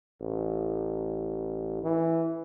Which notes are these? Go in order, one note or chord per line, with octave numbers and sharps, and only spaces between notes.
A1
E3